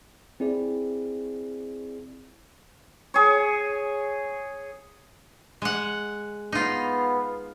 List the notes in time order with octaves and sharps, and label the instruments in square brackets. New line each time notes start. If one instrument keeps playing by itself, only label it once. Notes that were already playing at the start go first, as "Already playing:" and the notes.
[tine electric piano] C4 E4 G#4 D5
[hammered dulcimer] G#4 C#5
[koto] G#3 F#5
[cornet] B3 [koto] D#4 F4